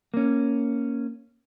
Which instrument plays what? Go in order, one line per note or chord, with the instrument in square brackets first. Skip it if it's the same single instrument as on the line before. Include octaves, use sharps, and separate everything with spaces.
[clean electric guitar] A#3 C#4